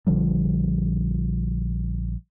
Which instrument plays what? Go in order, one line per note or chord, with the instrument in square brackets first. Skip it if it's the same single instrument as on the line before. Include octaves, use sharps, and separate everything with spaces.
[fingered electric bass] A#1 D3 F3 G3